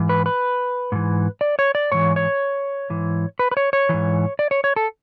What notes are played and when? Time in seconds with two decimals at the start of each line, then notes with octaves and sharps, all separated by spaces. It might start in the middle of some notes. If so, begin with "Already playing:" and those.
Already playing: G#2 E3
0.09 B4
0.26 B4
0.92 G#2 E3
1.41 D5
1.59 C#5
1.75 D5
1.92 G#2 E3 C#5
2.16 C#5
2.90 G#2 E3
3.39 B4
3.51 B4
3.57 C#5
3.73 C#5
3.89 G#2 E3
4.39 D5
4.51 C#5
4.64 C#5
4.76 A4